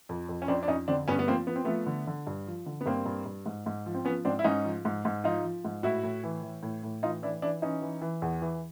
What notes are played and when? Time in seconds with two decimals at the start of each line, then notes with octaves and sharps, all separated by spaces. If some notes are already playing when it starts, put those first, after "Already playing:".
0.09 F2
0.29 F2
0.42 C#4
0.48 F2 C4 D4
0.63 D4
0.68 F2 C#4 D#4
0.88 D3 C4 D4
1.08 G2 B3 C#4
1.19 B3
1.28 F3 A#3 C4
1.47 F3 B3
1.56 C4
1.65 F3 A3 B3
1.87 D3
2.07 D3
2.27 G2
2.47 F3
2.66 D3
2.81 B3
2.86 G2 A#3 C4
3.06 G2
3.26 G2
3.46 G#2
3.66 G#2
3.86 F3
3.95 C4
4.05 F3 B3 C#4
4.25 G#2 C4 D4
4.39 E4
4.44 G#2 C#4 D#4
4.64 F3
4.85 G#2
5.05 G#2
5.24 F3 D#4 F4
5.45 F3
5.65 G#2
5.83 A2 E4 F#4
6.04 A2
6.24 E3
6.43 E3
6.63 A2
6.84 A2
7.03 E3 D#4 F4
7.23 E3 D4 E4
7.42 E3 D4 E4
7.62 E3 C#4 D#4
7.82 E3
8.02 E3
8.22 E2
8.42 E3